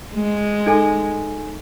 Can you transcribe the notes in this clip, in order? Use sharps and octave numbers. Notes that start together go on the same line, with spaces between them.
G#3
D#4 A4 G#5